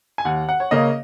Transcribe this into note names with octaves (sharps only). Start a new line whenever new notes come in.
G#5
D#2 F#5
F#5
C#5
C#3 A#3 C#4 D#5